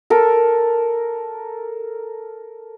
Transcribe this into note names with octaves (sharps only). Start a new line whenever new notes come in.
A4 A#4